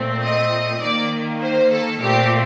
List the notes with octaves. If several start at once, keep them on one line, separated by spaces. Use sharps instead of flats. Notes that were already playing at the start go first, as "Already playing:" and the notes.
Already playing: A#2 A3 C4
D#5
D#3 A#3 D5
C5
A4
A#2 A3 C4 G4